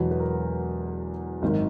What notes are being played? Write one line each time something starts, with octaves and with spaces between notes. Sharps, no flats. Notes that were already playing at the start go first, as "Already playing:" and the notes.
Already playing: E1 E2 B2 F#3 B4
B4
A#4
G#1 F#2 D#3